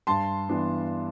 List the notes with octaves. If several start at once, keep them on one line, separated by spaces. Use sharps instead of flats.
G2 A5 C6
E3 B3 D4